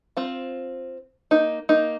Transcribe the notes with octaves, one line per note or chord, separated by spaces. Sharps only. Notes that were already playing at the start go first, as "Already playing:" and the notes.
C4 F4
A#3 D#4
A#3 D#4